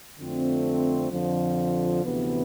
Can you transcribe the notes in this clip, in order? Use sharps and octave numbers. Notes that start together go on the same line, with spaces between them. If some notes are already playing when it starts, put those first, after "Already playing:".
F2 D3 A3 C4
F2 D3 F3
D2 C3 E3 B3